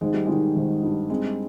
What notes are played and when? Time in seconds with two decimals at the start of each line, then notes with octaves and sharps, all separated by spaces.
0.01 G#1 G#3
0.14 G3
0.26 D#3 G#3
0.56 G#1
0.83 G2
1.10 G#3 C4